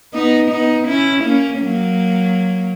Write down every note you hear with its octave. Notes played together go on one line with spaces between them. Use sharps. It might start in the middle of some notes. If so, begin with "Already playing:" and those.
B3 D#4
B3 D#4
C#4 E4
A#3 C#4
F#3 A#3